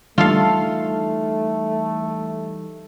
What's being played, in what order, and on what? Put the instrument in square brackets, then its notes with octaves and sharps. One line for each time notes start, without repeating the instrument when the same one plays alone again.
[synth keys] E3 G3 D#4 [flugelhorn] A3 [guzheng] F4 A4 F5